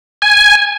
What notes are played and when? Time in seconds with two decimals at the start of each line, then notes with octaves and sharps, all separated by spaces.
0.22 G#5